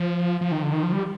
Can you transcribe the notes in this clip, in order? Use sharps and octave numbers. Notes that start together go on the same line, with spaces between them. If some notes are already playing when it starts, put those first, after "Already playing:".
Already playing: F3
F3
D#3
D3
D#3
F3
G3